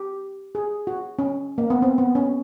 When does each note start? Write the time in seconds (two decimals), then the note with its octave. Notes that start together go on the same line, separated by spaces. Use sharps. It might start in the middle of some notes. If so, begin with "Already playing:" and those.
Already playing: G4
0.55 G#4
0.87 F#4
1.19 C#4
1.58 A#3
1.70 B3
1.82 C4
1.98 B3
2.15 C#4